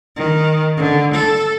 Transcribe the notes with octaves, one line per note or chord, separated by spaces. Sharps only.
D#3
D3
A4